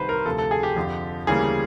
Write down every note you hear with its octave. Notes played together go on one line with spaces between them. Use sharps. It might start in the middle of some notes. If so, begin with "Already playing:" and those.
Already playing: C2 C3 D#3 B4 C5
A#4
D2 C3 F3 A4
A4
G#4
G4
F2 D3 F3
D2 C#3 E3 G3 A#3 G#4